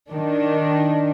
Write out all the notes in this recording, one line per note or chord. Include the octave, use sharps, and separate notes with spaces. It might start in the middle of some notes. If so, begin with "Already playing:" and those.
D#3 D4